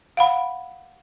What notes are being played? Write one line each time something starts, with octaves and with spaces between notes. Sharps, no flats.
F5 F#5 B5